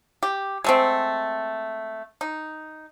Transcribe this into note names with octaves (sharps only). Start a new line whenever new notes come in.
G4
G#3 A3 C4
D#4